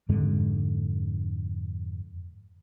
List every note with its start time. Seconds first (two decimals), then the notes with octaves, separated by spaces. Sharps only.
0.09 F2 G#2 D3 G#3